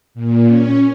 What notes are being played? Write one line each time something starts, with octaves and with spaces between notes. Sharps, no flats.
A#2
C#4